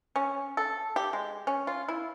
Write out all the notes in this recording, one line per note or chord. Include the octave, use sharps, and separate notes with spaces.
C#4
A4
G4
G#3
C#4
F4
E4